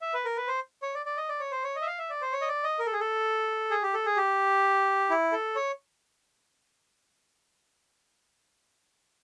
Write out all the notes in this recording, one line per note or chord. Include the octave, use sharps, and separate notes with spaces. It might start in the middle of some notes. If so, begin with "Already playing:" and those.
E5
B4
A#4
B4
C5
C#5
D5
D5
D#5
D5
C#5
C5
C#5
D#5
E5
F5
E5
D5
C5
C#5
D#5
D5
D#5
A#4
A4
G#4
A4
G#4
G4
A4
G#4
G4
E4
A4
C#5